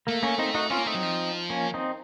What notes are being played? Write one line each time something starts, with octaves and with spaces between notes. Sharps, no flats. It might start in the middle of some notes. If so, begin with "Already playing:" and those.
A3 A#3
A#3 C#4
C4 D#4
D#4 F#4
C4 C#4 F4
A#3
A3 C4 D#4
F#3
F3
A#3 C#4
C4 D#4